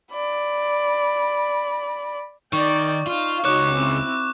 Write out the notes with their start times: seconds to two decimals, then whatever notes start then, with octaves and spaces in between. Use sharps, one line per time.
0.11 D5 B5
2.53 D#3 D5 G5 C#6
3.07 D#4 F4 F5
3.45 C#2 D#4 F#4 C#5 D6 F#6 E7
3.74 C4 E4